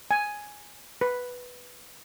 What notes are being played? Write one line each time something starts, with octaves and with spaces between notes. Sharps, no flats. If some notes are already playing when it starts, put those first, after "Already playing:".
G#5
B4